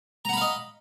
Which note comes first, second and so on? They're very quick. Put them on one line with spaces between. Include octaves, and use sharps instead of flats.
A#5 F#5 B5 F5 D#5